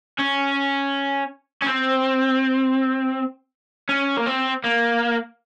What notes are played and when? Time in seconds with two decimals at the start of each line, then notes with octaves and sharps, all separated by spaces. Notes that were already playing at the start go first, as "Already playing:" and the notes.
0.18 C#4
1.62 C#4
1.66 C4
3.89 C#4
4.17 A#3
4.26 C4
4.64 A#3